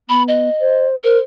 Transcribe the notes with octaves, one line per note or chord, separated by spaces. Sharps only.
B3 B5
D#5
C5
A#4 C5